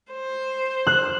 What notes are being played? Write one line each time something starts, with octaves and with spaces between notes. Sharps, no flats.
C5
F#6